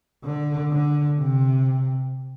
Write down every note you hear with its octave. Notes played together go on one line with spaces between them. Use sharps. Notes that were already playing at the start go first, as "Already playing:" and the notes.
D3
D3
C3